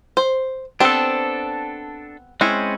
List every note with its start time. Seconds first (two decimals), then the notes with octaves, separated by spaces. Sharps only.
0.17 C5
0.80 B3 C4 D4 G4 A4
2.41 G#3 C4 C#4 E4